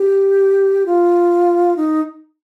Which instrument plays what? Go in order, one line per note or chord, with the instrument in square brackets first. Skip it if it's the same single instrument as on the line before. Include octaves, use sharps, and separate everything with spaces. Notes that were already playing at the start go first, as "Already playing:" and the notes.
Already playing: [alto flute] G4
F4
D#4